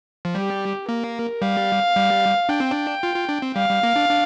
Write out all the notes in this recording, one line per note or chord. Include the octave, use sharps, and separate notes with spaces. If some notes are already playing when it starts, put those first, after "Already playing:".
F3
G3 G4
A#3 A#4
G3 F5
G3
D4 G5
C4
D4
F4
F4
D4
C4
G3 F5
G3
A#3
D4
D4